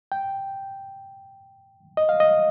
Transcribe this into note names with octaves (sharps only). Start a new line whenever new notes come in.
G5
D#5
F5
D#5